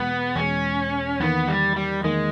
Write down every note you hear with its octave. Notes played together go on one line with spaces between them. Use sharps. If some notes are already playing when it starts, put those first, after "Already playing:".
Already playing: E2 B2 G#3 B3
E2 B2 G#3 C#4
E2 D#3 A#3 B3
G3
G3
E2 D#3 G#3 A#3